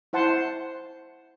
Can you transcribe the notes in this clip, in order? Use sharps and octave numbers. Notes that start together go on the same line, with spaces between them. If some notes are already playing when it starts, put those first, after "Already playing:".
E4 C5 F#5 A5 C6